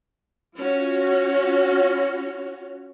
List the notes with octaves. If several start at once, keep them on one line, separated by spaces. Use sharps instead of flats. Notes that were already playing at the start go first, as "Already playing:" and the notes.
C#4 F4 F#4